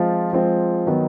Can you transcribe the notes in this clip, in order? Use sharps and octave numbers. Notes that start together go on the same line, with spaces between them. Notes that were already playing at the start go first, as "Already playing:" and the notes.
Already playing: F3 G#3 C4 F4
F3 G#3 C4 F4
D#3 F#3 B3 D#4